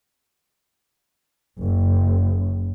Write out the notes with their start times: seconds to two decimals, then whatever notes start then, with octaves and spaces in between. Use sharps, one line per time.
1.63 F#1